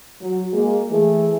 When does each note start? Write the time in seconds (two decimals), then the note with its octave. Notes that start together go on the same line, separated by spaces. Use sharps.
0.21 F#3
0.53 G#3 A#3
0.91 E3 A3 G#4